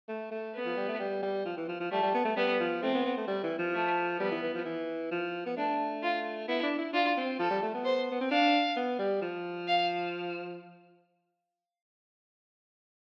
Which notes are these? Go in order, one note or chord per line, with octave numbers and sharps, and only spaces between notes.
A3
A3
B3
F3
G3
A3
G3
G3
F3
E3
F3
F3
G3 A3
G3
B3
A3
G3 B3
F3
A3 C4
B3
B3
A3
G3
E3
F3
A3
G3 B3
E3
E3
F3
E3
F3
B3
A3 D4
F4
B3 E4
D4
E4
D4 F4
C4
F3 A4
G3
A3
B3
C5
B3
C4
D4 F5
B3
G3
F3
F5